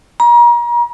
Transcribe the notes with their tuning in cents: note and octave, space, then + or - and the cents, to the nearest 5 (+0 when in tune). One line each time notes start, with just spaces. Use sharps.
A#5 +35